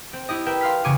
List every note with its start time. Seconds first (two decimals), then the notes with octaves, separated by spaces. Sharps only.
0.13 C4
0.29 E4 G4 D#5
0.46 A#4 B4 E5 G5
0.61 F5 C6 F6 B6
0.84 E1 C#3 G#5 C#6 D6 D#7